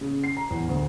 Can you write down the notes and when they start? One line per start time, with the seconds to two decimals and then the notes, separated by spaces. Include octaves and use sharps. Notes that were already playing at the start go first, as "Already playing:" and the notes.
0.01 C#3
0.24 C7
0.37 A#5
0.51 E2
0.68 D2